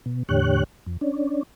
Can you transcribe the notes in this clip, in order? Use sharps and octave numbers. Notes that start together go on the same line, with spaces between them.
B2
E2 A2 D3 G4 C#5 F#6
F2
C#4 D4